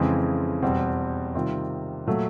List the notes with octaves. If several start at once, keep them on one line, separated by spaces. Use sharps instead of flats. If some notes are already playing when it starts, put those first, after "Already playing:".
Already playing: F2 C#3 E3 G#3 C4
E2 B2 G3 C4
C3 D#3 G3 C4 F4
A#2 F#3 A3